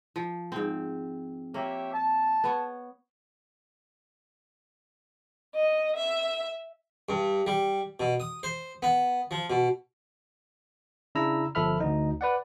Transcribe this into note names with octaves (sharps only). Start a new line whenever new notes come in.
F3
G#2 C4
A#3 G4 C#5 E5
A5
B3 C#5
D#5
E5
G2
G3
B2
D#6
C5
B3
F3
B2
C#3 D4 E4 A#5 E6
G1 F3 A4 E5 B5 F6
D2 D#4
B4 D5 F#5